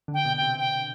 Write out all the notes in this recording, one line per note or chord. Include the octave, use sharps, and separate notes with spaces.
D3
G5
B2
G5
C3
G5